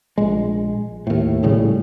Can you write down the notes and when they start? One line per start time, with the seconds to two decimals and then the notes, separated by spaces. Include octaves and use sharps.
0.18 A#1 G#3
1.07 D#2 A2
1.43 A#1 A2 C#3 G3